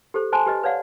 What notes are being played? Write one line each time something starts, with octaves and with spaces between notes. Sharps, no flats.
G4 A4 C5
C5 G#5 A5 C6
G4 B4 D#5
B4 C#5 D5 F5 F#5